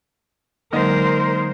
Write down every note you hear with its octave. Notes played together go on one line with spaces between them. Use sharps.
D3 F#3 G#3 A#3 D#4 A#4 C5 D#5